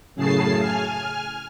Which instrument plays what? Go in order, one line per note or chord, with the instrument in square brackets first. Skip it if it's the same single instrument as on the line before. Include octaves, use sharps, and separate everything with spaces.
[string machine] F#2 A2 C#3 G#4 A5 C7
G#5 F6